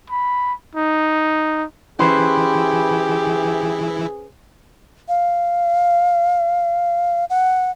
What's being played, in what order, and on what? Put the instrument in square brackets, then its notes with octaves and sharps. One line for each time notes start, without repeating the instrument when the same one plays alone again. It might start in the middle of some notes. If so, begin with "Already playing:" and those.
[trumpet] B5
D#4
[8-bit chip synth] E3 E4 [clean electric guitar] C#4 B4 C5 [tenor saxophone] G4 [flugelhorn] G#4
[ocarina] F5
F#5